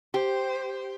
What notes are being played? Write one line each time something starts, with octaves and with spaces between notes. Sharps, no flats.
G4 C5